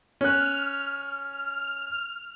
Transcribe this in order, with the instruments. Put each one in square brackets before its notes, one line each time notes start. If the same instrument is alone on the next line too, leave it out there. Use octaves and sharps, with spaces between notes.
[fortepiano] C#4 F#6 [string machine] F6